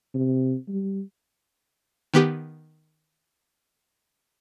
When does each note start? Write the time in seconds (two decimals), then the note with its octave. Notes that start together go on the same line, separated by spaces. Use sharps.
0.14 C3
0.68 G3
2.14 D#3 B3 G4